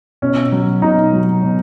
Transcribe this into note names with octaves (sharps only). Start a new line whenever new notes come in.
B2 C#4
F#3
B2 D#4
F#3
B2